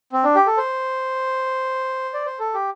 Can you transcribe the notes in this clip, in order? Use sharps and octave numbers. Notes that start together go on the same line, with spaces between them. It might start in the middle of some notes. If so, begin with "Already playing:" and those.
C4
D4
G4
A4
C5
D5
C5
A4
G4